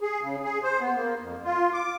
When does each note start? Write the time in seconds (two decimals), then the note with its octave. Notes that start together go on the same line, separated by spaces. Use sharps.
0.01 G#4
0.22 C#3
0.44 G#4
0.63 C5
0.81 B3
0.95 A#3
1.20 F2
1.45 F4
1.73 D6